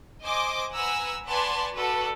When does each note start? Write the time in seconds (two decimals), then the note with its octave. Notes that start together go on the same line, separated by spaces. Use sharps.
0.23 C5 D#5 G#5 C6 D6
0.74 B4 F#5 G#5 A#5 E6
1.27 B4 D5 F#5 G#5 A5 C6
1.76 F#4 A4 B4 D5